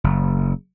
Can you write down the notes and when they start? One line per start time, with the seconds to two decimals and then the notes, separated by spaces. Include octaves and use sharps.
0.04 F#1